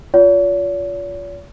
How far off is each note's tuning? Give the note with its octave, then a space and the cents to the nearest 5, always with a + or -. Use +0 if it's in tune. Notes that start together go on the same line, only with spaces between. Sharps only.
F4 +5 C#5 +45